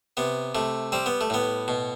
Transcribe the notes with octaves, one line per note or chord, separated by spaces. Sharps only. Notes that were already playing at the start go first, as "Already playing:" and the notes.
C3 B3
C3 A3
G3 C4
B3
A3
A2 B3
B2